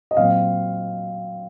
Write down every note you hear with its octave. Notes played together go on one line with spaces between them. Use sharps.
D#5
A#2 F#3 C4 F5